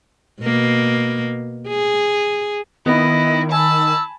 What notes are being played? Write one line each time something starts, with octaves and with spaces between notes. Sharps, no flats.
B2 A#3
G#4
D#3 B3 E4 D#5
G#5 A5 B5 E6